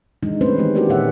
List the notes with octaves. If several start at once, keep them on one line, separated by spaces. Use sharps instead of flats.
D#3 E3 G#3 D4 D#4
A3 C4 C#4 D#4 B4 C5
D#3 E3 G#3 A#3 G4
E4 F#4 G4 A#4 C5 D5
A#2 D#3 G#4 C#5 E5 F#5